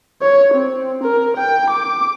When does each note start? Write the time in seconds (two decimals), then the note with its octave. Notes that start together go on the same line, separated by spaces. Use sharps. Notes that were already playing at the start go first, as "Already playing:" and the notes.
0.22 C#5
0.54 C4
1.03 A#4
1.37 G5
1.70 D6